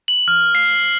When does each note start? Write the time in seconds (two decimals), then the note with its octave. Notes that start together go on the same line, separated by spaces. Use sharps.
0.08 F#7
0.28 F6
0.55 C7